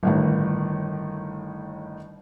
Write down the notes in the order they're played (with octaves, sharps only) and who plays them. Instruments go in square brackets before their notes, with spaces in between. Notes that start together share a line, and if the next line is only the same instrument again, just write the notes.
[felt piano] G1 A2 D#3